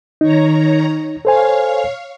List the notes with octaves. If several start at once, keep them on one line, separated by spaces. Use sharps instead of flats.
D#3 D#4 C#5 A#5
A4 C5 C#5 F5 G#5